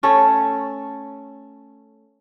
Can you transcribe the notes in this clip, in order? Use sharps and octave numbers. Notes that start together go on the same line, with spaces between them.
A3 C#4 A4